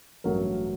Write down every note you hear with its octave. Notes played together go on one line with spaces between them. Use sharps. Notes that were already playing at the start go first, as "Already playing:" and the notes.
A1 G2 F#3 A3 A#4